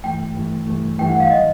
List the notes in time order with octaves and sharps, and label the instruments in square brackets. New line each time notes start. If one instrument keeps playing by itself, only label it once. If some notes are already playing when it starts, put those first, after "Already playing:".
[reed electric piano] G2 E3 A3 [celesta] G5
[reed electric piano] G2 E3 A3
G2 E3 A3
[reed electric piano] G2 E3 A3 [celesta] G5
[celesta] F#5
F5
[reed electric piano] D#3 F#3 [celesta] D#5